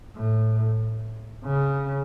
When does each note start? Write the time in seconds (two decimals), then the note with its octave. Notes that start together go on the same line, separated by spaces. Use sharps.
0.16 A2
1.44 C#3